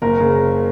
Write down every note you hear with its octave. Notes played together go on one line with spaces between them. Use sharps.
F#1 A#4
C#3